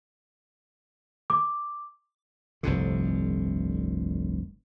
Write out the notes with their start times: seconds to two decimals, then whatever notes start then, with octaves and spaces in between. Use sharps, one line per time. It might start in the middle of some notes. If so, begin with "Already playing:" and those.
1.30 D6
2.63 F1 C2 G2 D3